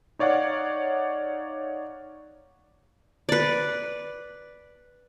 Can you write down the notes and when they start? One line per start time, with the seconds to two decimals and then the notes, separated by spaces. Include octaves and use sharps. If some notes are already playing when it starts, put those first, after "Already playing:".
0.19 D#4 C#5 D5 F5 F#5
3.29 B4 D5